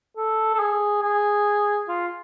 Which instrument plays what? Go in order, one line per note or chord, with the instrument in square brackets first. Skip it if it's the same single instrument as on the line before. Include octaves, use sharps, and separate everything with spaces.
[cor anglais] A4
A4
G#4
G#4
F4